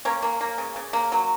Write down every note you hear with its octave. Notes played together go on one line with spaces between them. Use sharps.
A#3 C#4 C#5
A#3
A#3
C#3
C#3
A#3
F#3